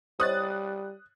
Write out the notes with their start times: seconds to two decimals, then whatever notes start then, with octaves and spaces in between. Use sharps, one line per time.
0.20 G3 C5 C#5 D#5 D#6 F#6 A6